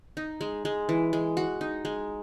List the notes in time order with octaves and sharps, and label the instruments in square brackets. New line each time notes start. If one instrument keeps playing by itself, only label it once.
[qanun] D#4
G#3
G#3
E3
G#3
F#4
D#4
G#3